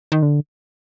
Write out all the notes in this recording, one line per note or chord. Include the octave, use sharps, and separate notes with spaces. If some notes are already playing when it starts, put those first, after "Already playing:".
D#3
D3